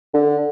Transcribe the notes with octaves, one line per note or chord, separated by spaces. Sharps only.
D3